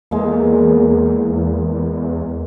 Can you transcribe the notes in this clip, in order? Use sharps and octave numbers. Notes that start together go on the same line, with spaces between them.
E2 G#3 A#3